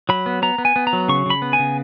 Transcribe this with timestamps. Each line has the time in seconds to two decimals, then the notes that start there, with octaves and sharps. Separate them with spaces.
0.09 F#3 B5
0.26 B3
0.42 B3 A#5
0.58 B3
0.65 G#5
0.76 B3
0.87 A#5
0.93 F#3
1.08 C#3 C#6
1.26 C#3 B5
1.42 B3
1.53 G#5
1.59 C#3